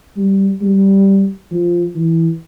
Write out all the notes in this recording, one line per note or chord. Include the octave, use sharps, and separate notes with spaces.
G3
G3
F3
E3